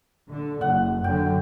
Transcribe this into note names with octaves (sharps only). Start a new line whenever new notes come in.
D3
F#1 F#5
F#2 D3 F#3 G5